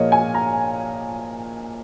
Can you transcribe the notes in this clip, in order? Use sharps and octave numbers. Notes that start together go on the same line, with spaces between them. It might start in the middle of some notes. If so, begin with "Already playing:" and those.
Already playing: A#2 F3 G#3 A#4 C#5 D#5
G#5
A#5